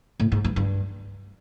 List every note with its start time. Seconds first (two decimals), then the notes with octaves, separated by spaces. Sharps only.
0.20 A2
0.32 G#2
0.44 G2
0.56 G2